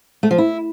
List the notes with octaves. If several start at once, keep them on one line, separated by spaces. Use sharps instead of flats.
A3
F3
E4